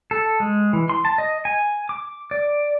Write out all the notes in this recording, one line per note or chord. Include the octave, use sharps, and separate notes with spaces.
A4
G#3
E3
C6
A5
D#5
G#5
D6
D5